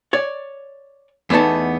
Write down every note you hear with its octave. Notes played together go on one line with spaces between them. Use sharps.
C#5 D5
E2 A3 B3 D#4 A5